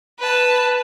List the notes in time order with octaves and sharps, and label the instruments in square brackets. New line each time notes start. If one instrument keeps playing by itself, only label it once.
[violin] B4 A5